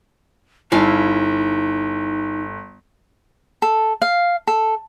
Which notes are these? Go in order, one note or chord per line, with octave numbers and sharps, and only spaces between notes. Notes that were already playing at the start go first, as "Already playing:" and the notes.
G1 D#4 E4 F5 G#5 A5
A4
F5
A4